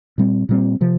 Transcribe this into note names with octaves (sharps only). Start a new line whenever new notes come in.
A#2 G3 C4
A#2 G3 C4
C3 F3